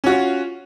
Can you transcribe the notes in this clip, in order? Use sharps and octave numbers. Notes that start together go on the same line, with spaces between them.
C#4 F4 F#4